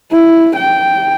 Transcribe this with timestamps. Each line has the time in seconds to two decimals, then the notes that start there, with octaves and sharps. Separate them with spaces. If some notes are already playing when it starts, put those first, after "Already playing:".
0.12 E4
0.56 G5